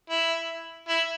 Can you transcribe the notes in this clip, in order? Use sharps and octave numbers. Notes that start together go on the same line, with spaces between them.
E4
E4